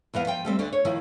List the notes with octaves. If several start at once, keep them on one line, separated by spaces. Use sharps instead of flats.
E2 E3 B3 F5
F3 G5
G3 A3 C4
D2 D3 D5
C#5
D#3 F3 E4